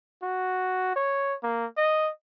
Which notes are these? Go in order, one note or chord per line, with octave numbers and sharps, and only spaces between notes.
F#4
C#5
A#3
D#5